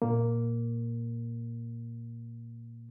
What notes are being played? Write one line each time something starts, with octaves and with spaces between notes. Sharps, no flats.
A#2 A#3